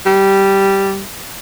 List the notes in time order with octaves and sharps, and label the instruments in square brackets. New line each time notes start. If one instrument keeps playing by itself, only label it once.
[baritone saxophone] G3